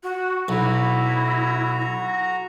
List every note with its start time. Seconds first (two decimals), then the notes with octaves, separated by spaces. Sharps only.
0.03 F#4
0.48 B1 E4 F#4 A#5